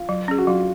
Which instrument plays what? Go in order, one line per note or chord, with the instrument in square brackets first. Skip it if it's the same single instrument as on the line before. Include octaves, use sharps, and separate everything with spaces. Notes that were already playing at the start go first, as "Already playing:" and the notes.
Already playing: [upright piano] F4
[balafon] F#3
C#4 G#4
[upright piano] F#4
[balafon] F#3 [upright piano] F4